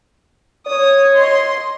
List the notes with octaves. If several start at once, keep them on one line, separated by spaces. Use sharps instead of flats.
C#5 D#6
D#5 C6